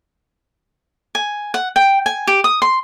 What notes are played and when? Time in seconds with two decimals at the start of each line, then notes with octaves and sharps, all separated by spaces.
1.15 G#5
1.54 F#5
1.76 G5
2.06 G#5
2.27 G4
2.44 D#6
2.62 C6